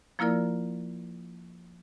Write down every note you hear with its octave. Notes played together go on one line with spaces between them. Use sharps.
F3 A#3 E4 F4 A#4 D5